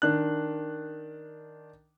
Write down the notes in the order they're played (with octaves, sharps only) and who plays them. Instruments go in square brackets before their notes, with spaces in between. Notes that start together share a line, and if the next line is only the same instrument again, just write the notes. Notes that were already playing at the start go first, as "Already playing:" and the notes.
[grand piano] D#3 D4 F#6